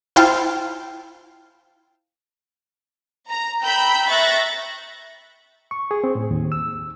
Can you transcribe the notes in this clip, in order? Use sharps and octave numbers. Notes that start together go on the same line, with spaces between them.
E4 F4 C5 F5 G5 A5
A#5
G5 A#5 B5 E6 G6
E5 C#6 F#6 G6 A6 A#6
C#6
G#4
C4
A2
D#2
E6